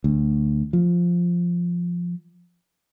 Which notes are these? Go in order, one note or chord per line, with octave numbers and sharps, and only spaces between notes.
D2
F3